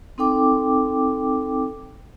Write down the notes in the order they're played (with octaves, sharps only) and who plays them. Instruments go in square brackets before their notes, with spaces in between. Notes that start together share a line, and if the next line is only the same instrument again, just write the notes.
[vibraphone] C4 D#4 A4 G5 D6